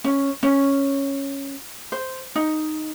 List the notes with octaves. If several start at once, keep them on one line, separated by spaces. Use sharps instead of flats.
C#4
C#4
C5
D#4